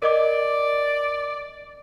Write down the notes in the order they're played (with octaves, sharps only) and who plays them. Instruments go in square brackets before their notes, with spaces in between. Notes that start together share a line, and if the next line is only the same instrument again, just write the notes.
[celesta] A#4 D#5 D6 [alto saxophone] D5